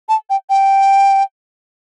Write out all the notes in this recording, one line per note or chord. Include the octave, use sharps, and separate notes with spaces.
A5
G5
G5